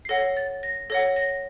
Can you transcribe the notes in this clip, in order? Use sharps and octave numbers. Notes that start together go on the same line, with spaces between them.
C7
A4 C#5 F#5 A#6
A6
A#6
A4 C#5 F#5 A#6
A#6